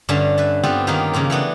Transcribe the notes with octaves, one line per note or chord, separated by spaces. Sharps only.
G2 D3 C#4 D4 E5 A5
B4 E5 A5
B3 C4 F4 G4 A4
D#3 A#3 C#4 D#4 F4 G4
C#3 F3 A#3 C4
E3 A3 B3 D4